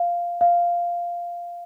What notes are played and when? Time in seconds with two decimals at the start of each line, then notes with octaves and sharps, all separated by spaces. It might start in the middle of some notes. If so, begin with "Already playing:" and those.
Already playing: F5
0.41 F5